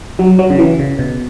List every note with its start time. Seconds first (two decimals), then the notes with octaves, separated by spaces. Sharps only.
0.19 F#3
0.39 F#3
0.50 C#3
0.59 E3
0.79 C#3
0.99 B2